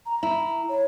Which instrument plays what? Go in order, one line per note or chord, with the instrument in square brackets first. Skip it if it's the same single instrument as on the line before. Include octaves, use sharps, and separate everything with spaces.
[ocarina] A#5
[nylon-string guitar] E4
[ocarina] C#5